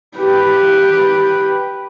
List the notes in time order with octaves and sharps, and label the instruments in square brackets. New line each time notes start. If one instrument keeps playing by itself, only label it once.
[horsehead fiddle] G4 B4